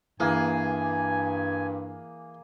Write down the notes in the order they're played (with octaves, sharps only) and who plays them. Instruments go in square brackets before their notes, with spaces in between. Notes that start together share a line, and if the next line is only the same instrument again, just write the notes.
[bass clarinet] G2 [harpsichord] E3 [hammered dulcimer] A#3 G#4 [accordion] G#5